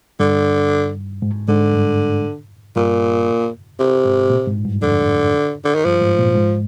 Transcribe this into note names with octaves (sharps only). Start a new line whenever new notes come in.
G2 D3
G#2
G#2 D3
G2
G2 A#2
C3
G#2
A#2
G#2
G2
F2 D3
D3
D#3
G2 F3
G#2
A#2
G#2